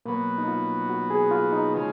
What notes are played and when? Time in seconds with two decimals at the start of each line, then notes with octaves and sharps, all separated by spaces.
0.06 B2 F#3 A#3 B3
0.38 D#4
0.48 F4
0.90 F#4
1.10 G#4
1.31 F4
1.52 D#4
1.74 C#3 F3 G#3